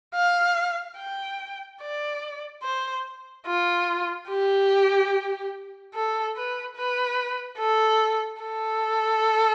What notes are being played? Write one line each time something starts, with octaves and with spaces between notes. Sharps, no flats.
F5
G5
D5
C5
F4
G4
A4
B4
B4
A4
A4